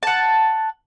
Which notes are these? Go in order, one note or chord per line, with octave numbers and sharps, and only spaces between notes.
F#5 A5